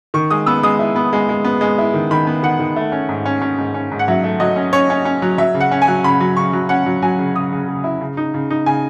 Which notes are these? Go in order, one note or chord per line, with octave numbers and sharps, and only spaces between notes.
D#3 C#6
G#3 D#6
B3 E6
G#3 D#6
E4
B3
G#3
G#3
B3
G#3
E4
D#3
D#3 B5
B3
D#3 F#5
D#3
A3
C#4
G#2
C#4
C#4
G#2
C#4
G#2
F#5
F#3 E5
A3
F#3 D#5
C#4
C#4 C#5
C#4
C#4
F#3
F#3 E5
C#3
F#5
C#4
G#5
F#3
C#3 B5
F#3
C#3 C#6
F#3
C#4 F#5
F#3
F#3 G#5
C#3
C#3 D#6
C#3
C#3
E4
C#3
D#4
C#3
D#4
C#3 G#5